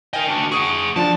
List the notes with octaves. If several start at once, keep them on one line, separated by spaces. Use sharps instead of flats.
A#4 D#5 G5 G#5
D4 F#4
G#4 F#5 C#6 D#6
F3 D4 A5